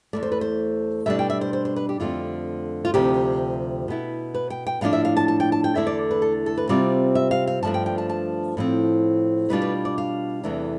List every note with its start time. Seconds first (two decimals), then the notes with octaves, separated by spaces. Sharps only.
0.13 E2 B2 A3 D5
0.23 C5
0.32 B4
0.41 C5
1.06 B2 G3 D4 E5
1.19 G5
1.30 E5
1.41 C5
1.53 C5
1.65 C5
1.76 B4
1.89 G4
2.00 F2 D3 A3 C4 F4
2.85 F4
2.94 D2 C3 F3 G4
3.88 B2 B3 E4
4.34 B4
4.50 G5
4.67 G5
4.81 A2 F3 A3 D4 F5
4.93 E5
5.05 F5
5.17 A5
5.28 A5
5.40 G5
5.52 A5
5.64 G5
5.75 E2 D3 A3 E4 E5
5.87 D5
6.11 B4
6.22 A4
6.46 A4
6.58 B4
6.69 C3 G3 C4 F4 D5
7.15 E5
7.31 F5
7.47 F5
7.63 G2 F3 A3 D4 A5
7.74 G5
7.86 G5
7.98 A5
8.10 A5
8.57 A2 F3 C4
9.50 B2 G3 D4 F4 B4
9.62 B4
9.85 D5
9.98 F5
10.44 E2 C3 E3 A3 D4